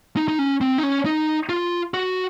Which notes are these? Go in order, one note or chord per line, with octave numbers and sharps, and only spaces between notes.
D#4
D#4
C#4
C4
D#4
C#4
D#4
F4
F#4